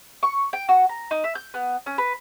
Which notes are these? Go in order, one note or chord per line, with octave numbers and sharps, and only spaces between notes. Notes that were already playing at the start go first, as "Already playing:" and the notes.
C#6
G5
F#4
A#5
D#4
E5
G6
B3
C#4
B4